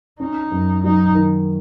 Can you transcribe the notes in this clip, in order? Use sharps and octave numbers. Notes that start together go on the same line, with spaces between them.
C#4 D#4
F#2
F#3 D#4
D#3